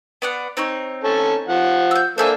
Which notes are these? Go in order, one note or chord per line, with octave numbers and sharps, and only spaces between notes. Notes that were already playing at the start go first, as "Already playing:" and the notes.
B3 D5 F#5
C4 D#4 C#5
C#4 A4 A5
F3 F#5
E6 G6
A#3 D4 A4 C5 E5 G#5